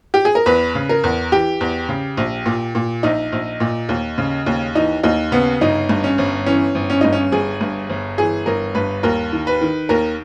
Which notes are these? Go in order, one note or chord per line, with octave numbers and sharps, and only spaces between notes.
G4
G#4
A#4
E2 B4
C#3
A#4
E2
E3 G4
E2
C#3
A#1
A#2
A#2
A#1 D#4
A#1
A#2
D#2
C#3
D#2
E3 D#4
D#2 D#4
C#3 B3
G1 D#4
G2
C#4
G1
E3 C#4
G1
C#4
G2 D#4
C#4
G1 G#4
G2
G1
E3 G#4
G1 A#4
G2 B4
D#2 A#4
D#3
B4
D#3
D#2 A#4